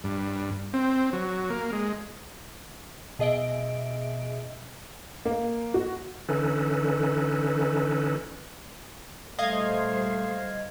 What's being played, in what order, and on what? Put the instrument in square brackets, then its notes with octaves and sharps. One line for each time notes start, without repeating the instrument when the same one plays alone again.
[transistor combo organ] G2
C4
F#3
A#3
G#3
[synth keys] B2 G#4 D#5 E5 D7
[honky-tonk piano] A#3
F#4
[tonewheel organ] D3 E3 C#4 D#4 A4 B4
[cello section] A#2 G3 C5 [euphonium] A3 [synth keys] D#5 F5 G#6